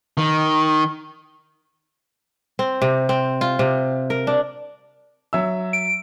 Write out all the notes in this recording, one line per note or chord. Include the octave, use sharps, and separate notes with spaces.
D#3
C4
C3
C4
F4
C3
A#4
D4
F#3 E5 E6
D7